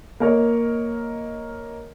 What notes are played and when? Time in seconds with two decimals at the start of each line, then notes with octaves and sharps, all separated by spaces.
0.20 A#3 A#4 C#5 D#5